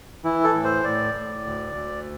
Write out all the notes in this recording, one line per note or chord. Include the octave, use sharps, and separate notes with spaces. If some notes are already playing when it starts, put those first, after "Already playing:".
E3 E4
A4
A2
C5
A2 D5
A2
D2
D2